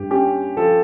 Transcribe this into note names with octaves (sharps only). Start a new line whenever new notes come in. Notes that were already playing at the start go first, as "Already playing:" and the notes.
Already playing: G2 G4
C#4 G4
F3 A4